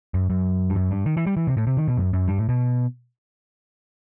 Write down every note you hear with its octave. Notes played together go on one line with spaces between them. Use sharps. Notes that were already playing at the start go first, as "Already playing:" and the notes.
F#2
F#2
G2
F#2
G2
D#3
E3
G3
E3
C3
A2
C3
D#3
B2
F#2
F#2
G2
A2
B2